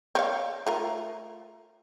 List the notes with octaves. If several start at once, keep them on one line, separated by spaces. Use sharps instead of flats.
C4 C#5 F5
A3 F4 A#4